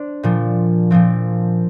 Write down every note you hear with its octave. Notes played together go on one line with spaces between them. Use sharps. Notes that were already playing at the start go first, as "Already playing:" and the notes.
Already playing: D4 C5
A#2 F3
A#2 F3 C4